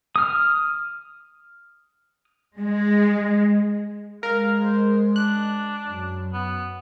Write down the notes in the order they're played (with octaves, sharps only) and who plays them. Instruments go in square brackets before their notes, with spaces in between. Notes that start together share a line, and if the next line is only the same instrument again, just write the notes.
[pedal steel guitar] D#6 F6
[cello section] G#3
[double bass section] G#3 [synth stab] A#4 [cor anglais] F5
[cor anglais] C5
[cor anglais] D4 [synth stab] F#6
[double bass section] F#2
[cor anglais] B3